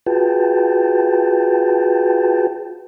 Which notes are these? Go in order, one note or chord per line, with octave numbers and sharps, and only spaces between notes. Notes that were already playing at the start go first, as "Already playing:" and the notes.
F4 F#4 G#4 B4 G5 A5